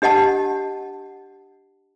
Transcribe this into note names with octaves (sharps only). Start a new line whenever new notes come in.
D4 G4 D#5 F#5 A5